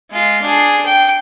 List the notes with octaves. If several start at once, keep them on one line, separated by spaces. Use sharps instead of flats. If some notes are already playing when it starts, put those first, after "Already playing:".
G#3 F4
D4 G#4
G5